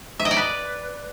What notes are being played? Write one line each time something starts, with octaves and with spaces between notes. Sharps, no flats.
E5
D#5
D5
B4